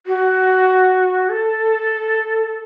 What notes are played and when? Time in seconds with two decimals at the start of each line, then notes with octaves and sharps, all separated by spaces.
0.07 F#4
1.29 A4